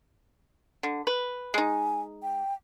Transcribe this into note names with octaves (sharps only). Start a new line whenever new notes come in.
D3
B4
G#3 D#4 G#5
G5